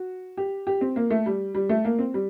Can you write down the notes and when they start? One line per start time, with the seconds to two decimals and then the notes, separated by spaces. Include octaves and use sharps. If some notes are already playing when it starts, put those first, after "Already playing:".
Already playing: F#4
0.37 G4
0.67 G4
0.81 C4
0.96 A#3
1.10 A3
1.26 G3
1.55 G3
1.69 A3
1.85 A#3
1.99 C4
2.14 G3